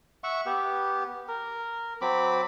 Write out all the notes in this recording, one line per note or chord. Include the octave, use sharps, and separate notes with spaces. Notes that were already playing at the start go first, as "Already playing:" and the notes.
E5 F#5 C#6
B3 G4
A#4
F#3 C4 B5 D6